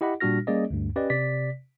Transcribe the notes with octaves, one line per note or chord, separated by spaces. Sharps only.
E4 G4 D#5 F#5 B5
A#2 G3 D4 F#4 F6 A#6
G3 A#3 C#4 G#4 D5 D#5
D2 G2
C#4 G4 B4 D5 D#5
C3 D5 B6